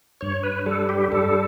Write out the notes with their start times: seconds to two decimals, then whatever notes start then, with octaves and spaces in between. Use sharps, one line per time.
0.21 G2 C#5
0.43 B4
0.66 G3 A4
0.89 G4
1.12 G2 A4